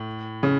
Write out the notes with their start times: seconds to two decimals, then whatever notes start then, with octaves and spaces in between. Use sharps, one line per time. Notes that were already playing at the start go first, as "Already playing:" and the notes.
Already playing: A2
0.43 C#3